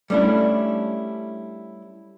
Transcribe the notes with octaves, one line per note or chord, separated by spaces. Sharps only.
G3 A3 C#4 D4 E4